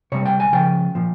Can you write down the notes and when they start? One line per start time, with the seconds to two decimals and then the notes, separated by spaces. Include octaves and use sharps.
0.12 C3 G3 C#5
0.26 G5
0.40 G#5
0.53 C#3 F3 G5
0.95 A#2 F3